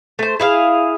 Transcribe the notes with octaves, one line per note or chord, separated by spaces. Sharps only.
A3 C5
E4 G#4 F5